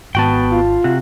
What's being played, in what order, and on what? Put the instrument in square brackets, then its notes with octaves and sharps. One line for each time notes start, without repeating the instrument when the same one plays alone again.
[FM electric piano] G#1 A5 [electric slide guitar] B3 F#4 G5
[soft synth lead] F4
[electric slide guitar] C3 F#4